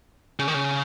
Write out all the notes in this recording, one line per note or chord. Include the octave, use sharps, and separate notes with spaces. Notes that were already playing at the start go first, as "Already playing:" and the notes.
C#3
D#3
C#3